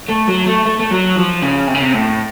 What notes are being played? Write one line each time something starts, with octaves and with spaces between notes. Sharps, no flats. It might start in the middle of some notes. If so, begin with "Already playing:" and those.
A3
F#3
A3
A3
A3
F#3
F3
C#3
C3
C#3
C3
A2